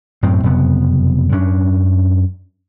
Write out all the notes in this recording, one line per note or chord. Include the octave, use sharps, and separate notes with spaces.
F#2 A2 C4
F#1 F2 C3 B3
F#2 C#4 D4